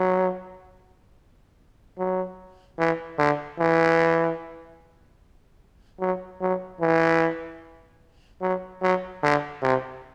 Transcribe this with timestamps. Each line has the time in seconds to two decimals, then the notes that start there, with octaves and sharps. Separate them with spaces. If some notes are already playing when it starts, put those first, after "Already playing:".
Already playing: F#3
1.98 F#3
2.79 E3
3.19 D3
3.59 E3
6.00 F#3
6.41 F#3
6.81 E3
8.42 F#3
8.82 F#3
9.23 D3
9.62 C3